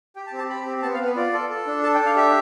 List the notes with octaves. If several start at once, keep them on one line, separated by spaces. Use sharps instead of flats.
G4 G5
A5
C4
A5
G4 B5
C4
B3 A5
F5
B3
B4
F4 D5
A4
A4
D4
A4 A5
G5
D4
F5
G4 E5